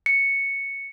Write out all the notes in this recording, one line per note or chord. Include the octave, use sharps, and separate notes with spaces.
C#7